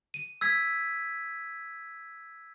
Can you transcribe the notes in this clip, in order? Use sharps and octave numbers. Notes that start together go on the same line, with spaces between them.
D#7
E6 G#6 B6